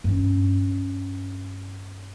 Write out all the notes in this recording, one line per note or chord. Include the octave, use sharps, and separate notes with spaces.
G2 C#4